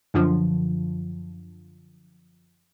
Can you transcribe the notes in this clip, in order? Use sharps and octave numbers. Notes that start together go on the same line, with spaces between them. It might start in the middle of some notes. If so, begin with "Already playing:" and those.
F#2 D3 F3